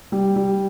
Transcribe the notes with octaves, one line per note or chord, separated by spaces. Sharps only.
G3
G3